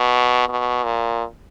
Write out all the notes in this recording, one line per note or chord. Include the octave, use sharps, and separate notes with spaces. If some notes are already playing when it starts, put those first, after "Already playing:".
Already playing: B2
B2
A#2